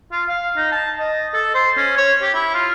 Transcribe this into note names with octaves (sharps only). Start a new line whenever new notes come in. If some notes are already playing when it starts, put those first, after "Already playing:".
F4
F5
D#4
A5
D#5
A4
C5
C#4
C#5
G4
E4
F4